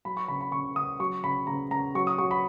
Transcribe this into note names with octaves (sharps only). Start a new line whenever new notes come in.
F#3 B5
C#6
C#3 B5
B5
C#3 C#6
C#3 D#6
F#3 C#6
C#3 B5
C#3 A#5
C#3 A#5
F#3 C#6
D#6
F#3 C#6
B5